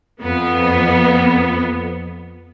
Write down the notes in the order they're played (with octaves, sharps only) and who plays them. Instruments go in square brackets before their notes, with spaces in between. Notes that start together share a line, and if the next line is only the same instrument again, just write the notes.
[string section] F2 B3